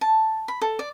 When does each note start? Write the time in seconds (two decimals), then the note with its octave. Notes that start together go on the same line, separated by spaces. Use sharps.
0.01 A5
0.48 B5
0.61 A4
0.79 D5